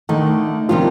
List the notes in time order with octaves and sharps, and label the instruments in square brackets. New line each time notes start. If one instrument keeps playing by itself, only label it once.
[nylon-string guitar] D3 A3 D#4 [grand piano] D#3
[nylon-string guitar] C3 D#3 G3 D4 F4 [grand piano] F3